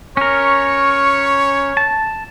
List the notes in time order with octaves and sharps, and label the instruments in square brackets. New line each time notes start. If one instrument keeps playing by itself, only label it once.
[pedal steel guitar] C#4 A#4 [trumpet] C#5 [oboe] C#6
[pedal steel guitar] A5